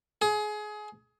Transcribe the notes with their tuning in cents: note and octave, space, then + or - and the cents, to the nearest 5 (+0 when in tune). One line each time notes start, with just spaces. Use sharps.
G#4 +25